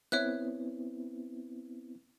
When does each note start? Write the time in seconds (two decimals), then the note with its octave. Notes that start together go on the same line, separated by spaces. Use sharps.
0.12 B3 C4 E4 C#5 E5 F#6